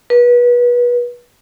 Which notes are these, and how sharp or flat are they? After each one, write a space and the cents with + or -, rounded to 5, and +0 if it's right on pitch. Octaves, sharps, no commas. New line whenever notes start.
B4 -30